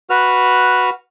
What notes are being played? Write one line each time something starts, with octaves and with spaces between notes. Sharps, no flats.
F#4 B4 F6